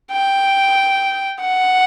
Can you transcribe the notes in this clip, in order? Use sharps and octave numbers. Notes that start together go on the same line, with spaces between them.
G5
F#5